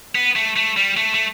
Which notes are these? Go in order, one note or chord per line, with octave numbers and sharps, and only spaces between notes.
B3
A3
A3
G3
A3
A3